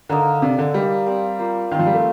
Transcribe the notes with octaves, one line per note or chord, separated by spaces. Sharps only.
D3 A#3 D#4 A#4 D#5
C3 D4 A4 D5
D3
G3 A#3 D#4 G4
C4 G4 D5 F5
A#3 F4 C5
D#3 C4 F4 C5 F5
F3
G3
A3